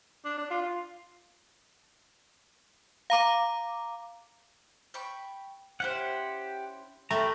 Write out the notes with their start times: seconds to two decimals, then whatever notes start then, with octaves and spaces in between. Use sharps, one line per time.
0.25 D4
0.38 D4
0.50 F4
0.62 F4
3.10 F5 A#5 D6
4.94 G5 B5 C#6
5.80 C#4 E4 G4 C5 F#5
7.11 A3 G4 A#4 G5 A#5 B5